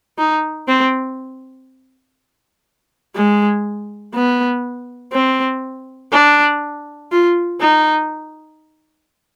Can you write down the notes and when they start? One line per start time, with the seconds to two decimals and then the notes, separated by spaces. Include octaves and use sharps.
0.19 D#4
0.68 C4
3.15 G#3
4.14 B3
5.13 C4
6.12 D4
7.11 F4
7.60 D#4